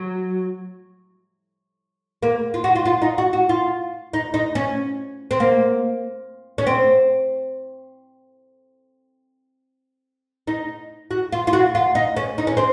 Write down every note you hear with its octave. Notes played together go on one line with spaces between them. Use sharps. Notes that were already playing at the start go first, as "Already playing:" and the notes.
Already playing: F#3
A#3
F4
F#4
F4
F4
D#4
F#4
F#4
F4
D#4
D#4
C#4
C4
A#3
C#4
C4
D#4
F#4
F4
F4
F#4
F4
D#4
C#4
D#4
C#4
C4